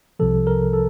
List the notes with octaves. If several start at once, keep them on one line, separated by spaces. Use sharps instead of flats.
C2 C3 F3 A4
A#4
A4